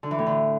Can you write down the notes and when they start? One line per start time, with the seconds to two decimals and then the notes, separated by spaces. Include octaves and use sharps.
0.03 D3
0.11 E3
0.19 A2
0.26 D3